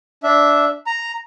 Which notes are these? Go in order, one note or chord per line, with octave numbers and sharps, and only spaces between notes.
D4 E5
A#5